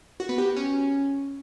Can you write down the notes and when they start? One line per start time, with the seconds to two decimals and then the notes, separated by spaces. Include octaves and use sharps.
0.20 F#4
0.29 B3
0.38 G4
0.47 F#4
0.56 C#4